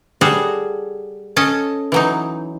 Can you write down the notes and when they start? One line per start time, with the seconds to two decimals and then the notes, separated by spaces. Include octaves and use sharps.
0.21 G3 F#4 G#4 A4 C#5
1.37 C#4 A4 D#5
1.92 E3 F#3 D#4